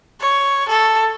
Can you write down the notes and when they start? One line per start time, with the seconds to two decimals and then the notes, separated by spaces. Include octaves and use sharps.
0.21 C#5
0.69 A4